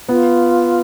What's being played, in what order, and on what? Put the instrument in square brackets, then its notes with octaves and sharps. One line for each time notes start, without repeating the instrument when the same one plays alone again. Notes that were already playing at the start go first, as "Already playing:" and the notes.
[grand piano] B3 [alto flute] F4